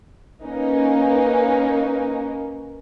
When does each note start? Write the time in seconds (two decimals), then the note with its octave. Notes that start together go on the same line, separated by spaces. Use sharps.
0.45 A#3 C#4 D#4 A#4 B4